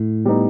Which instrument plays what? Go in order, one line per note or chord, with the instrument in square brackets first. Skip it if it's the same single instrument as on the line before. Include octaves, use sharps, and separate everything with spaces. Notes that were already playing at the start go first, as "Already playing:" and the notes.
Already playing: [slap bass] A2
[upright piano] G3 B3 D#4